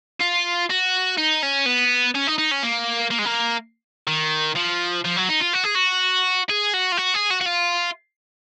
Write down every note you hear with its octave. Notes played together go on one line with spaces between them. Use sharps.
F4
F#4
D#4
C#4
B3
C#4
D#4
D#4
C#4
A#3
A#3
G#3
A#3
D#3
F3
F3
F#3
D#4
F4
F#4
G#4
F#4
G#4
F#4
F4
F#4
G#4
F#4
F#4
F4